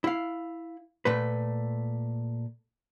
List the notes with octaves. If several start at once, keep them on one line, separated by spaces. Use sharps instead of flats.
E4 F5
A#2 A3 B4